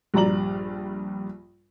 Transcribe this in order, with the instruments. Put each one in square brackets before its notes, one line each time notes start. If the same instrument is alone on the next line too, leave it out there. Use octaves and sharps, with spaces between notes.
[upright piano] A#1 G2 G3 D5 A#5 F#7